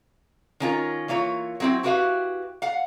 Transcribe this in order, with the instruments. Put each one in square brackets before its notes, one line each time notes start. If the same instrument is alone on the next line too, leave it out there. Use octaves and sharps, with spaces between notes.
[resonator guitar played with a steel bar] D#3 C#4 F4 A#4
E3 A#3 F4 C#5
F#3 C4 E4
E4 F#4 G4 B4 E5 F5
F5 F#5